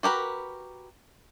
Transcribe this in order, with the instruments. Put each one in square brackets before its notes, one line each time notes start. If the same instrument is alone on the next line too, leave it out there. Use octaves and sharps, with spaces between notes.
[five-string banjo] F#4 G4 A#4 B4